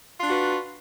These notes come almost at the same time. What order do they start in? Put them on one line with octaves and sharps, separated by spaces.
F4 D4 F#4 B4